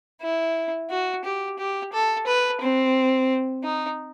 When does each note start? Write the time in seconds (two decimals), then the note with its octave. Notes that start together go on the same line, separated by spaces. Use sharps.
0.22 E4
0.90 F#4
1.24 G4
1.58 G4
1.93 A4
2.27 B4
2.61 C4
3.63 D#4